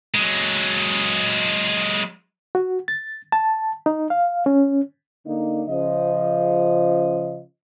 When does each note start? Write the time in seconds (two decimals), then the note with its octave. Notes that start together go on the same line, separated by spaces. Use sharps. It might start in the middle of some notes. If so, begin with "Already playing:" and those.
0.15 F#3 G#3
2.55 F#4
2.88 A6
3.32 A5
3.86 D#4
4.10 F5
4.46 C#4
5.27 D3 A#3 D4 D#4
5.69 C#3 F3 D#5